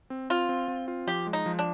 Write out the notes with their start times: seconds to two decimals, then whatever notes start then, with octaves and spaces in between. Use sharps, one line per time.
0.10 C4
0.30 C4 F4
0.49 C4
0.68 C4
0.88 F4
1.07 F3 G4
1.27 G#3
1.33 D#4
1.46 F3
1.59 D4